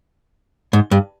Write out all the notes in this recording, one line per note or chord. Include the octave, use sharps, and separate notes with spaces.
G#2
G2